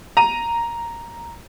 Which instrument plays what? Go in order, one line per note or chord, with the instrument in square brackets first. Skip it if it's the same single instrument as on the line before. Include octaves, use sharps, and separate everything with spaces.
[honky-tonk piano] A#5 D#7